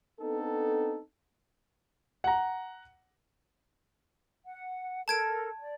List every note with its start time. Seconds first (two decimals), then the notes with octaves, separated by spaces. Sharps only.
0.20 B3 C4 D4 D#4 A4
2.24 F#5 A#5
4.45 F#5
5.08 A4 A#4 A5 G#6 D7
5.60 D5